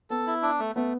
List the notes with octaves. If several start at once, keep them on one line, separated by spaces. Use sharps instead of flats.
B3 A4
E4
D4
A3
A3 B3